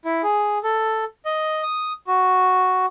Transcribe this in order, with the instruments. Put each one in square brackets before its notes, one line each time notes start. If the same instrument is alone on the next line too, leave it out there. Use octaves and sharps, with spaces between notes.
[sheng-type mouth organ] E4
G#4
A4
D#5
D#6
F#4